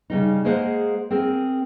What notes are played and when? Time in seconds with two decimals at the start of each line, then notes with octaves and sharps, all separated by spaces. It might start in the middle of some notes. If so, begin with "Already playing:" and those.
0.10 C#3 G3 D#4
0.45 G#3 A#3 G#4 C5 F5 F#5
1.10 C4 G#4 A#4